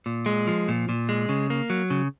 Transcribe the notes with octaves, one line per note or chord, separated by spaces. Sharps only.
A#2
G#3
F3
A#2
A#2
G#3
C#3
A#3
F#3
C#3